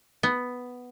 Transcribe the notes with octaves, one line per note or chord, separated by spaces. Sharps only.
B3